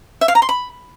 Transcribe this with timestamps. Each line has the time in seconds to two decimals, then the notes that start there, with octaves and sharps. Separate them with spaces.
0.21 E5
0.28 F5
0.35 A#5
0.42 C6
0.49 B5